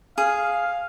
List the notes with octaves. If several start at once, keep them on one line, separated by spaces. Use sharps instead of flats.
G#4 F5